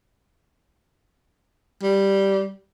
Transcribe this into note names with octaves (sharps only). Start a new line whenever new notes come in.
G3